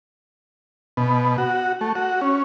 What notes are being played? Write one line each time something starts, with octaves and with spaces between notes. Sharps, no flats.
B2
F#4
A3
F#4
C#4